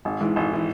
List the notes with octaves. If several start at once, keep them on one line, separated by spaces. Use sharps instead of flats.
G#1
G#2 E3
G#1
E3